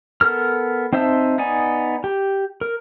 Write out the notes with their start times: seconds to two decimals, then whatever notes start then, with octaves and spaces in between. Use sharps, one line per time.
0.21 B3 A4 A#4 F6
0.93 C4 D#4 C5 E5 A5
1.38 B3 D#4 D5 G#5
2.04 G4
2.61 A#4